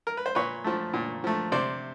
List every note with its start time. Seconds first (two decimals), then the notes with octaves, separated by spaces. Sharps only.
0.07 A#4
0.17 B4
0.26 C5
0.35 A#2 B4 C#5
0.64 F3 A3
0.94 A#2
1.24 F3 A3
1.52 C3 C5 D5